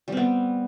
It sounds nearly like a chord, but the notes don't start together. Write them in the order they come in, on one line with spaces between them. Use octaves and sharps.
G3 C4 B3